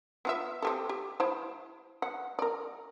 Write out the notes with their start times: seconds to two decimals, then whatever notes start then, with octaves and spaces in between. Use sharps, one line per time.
0.25 B3 F4 E5
0.62 C4 G4 A4
0.89 G4
1.20 E4 C5
2.02 F#5
2.39 A#4 D5